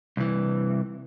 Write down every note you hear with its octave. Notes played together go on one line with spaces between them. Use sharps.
C2 E3